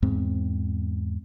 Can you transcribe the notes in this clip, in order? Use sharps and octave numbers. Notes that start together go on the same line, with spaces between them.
E2 G#2 C4